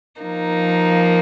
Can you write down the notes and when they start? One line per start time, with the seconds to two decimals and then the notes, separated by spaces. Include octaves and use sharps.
0.20 F3 A#3 D#4